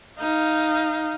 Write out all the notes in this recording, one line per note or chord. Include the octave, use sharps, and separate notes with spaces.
D#4 F5